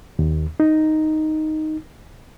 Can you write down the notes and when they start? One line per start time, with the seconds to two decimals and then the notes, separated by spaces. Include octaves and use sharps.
0.19 D#2
0.60 D#4